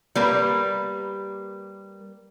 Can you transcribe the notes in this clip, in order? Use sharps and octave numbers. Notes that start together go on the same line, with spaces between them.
G3 A#3 B4